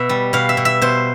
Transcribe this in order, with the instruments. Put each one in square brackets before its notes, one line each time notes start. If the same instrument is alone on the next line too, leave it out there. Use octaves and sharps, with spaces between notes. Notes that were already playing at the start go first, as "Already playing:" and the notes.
Already playing: [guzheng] B2 E5
G3
B2 F5
E5
B2
E5
B2 C5